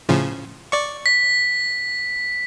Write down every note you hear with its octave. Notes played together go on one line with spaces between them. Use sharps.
A2 C#3 F3
D5 C#6
B6